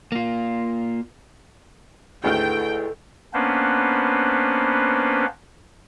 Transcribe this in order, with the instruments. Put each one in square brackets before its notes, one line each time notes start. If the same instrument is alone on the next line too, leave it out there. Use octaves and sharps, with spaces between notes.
[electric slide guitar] A#3 F4
[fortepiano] G#1 D2 F6 [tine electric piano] E4 G#4 B4 [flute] A4 [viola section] G5
[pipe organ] A#3 B3 C#4 D4 B4 C5